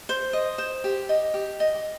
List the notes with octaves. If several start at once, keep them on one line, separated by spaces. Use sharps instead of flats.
C5
D#5
C5
G4
D#5
G4
D#5